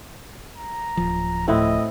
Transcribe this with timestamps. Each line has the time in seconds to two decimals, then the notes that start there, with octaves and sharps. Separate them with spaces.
0.56 A#5
0.97 D1 F3
1.48 A2 C4 E4 D#5 F#5